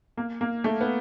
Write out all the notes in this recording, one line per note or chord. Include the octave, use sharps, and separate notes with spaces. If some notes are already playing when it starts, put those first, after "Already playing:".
A#3
A#3
A3
B3